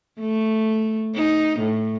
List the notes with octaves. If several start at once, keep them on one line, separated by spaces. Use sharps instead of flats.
A3
D#4
A2